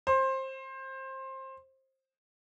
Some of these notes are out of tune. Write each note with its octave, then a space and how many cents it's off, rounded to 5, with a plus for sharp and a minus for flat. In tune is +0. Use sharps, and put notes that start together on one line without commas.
C5 +20